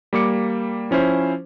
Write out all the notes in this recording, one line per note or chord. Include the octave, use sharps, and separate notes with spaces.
G3 A#3 D6 C#7
F3 C#4 E4 C5